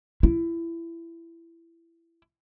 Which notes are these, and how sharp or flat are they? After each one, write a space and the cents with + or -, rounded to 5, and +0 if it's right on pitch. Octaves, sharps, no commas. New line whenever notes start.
E4 +20